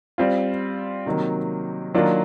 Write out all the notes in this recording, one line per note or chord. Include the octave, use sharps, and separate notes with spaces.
G3 C4 F4
C3 D#3 F#3 A#3
D#3 F#3 A#3 D4 F4